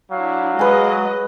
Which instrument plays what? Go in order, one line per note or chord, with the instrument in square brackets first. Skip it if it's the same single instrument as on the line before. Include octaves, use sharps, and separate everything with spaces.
[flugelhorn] F#3 [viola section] D4 E4 [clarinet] F5
[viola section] G#3 D#5 [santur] B4 G#5